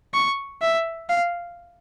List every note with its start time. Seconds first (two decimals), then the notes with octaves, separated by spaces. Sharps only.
0.14 C#6
0.62 E5
1.09 F5